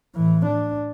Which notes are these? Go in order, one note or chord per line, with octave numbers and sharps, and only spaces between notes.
A2 E3
D4